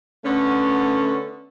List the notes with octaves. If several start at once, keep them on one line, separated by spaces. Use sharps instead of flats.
D3 A3 B3 C#4